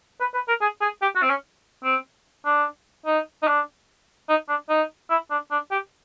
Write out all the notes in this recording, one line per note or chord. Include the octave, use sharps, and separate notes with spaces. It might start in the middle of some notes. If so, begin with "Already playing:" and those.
B4
B4
A#4
G#4
G#4
G4
F#4
C4
C#4
C4
D4
D#4
D#4
D4
D#4
D4
D#4
E4
D4
D4
G4